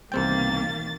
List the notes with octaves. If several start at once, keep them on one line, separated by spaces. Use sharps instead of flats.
C2 B2 D#3 E3 A#3 C4 G5 A6